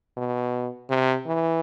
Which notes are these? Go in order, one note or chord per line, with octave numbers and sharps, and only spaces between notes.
B2
C3
E3